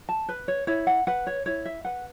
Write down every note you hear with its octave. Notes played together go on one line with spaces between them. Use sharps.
A5
B4
C#5
E4 C#5
F#5
B4 F#5
C#5
E4 C#5
E5
B4 F#5